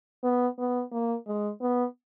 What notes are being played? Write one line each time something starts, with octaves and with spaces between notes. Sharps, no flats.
B3
B3
A#3
G#3
B3